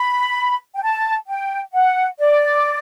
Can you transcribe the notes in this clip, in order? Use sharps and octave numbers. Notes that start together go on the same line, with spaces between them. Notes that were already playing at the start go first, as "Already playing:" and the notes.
Already playing: B5
G5
A5
G5
F#5
D5